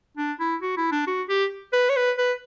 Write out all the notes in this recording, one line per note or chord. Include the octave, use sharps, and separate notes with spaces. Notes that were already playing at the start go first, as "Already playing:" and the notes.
D4
E4
F#4
E4
D4
F#4
G4
B4
C#5
B4
B4